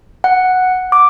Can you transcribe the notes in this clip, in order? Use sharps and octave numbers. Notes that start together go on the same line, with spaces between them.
F#5
D6